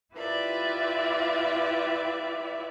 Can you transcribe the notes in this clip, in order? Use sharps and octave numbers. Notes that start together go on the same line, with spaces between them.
E4 F4 G4 B4 D5 E5